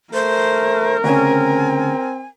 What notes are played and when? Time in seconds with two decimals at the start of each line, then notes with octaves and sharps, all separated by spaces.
0.14 A3 A#4 C5
1.04 D2 C#3 C4 G#5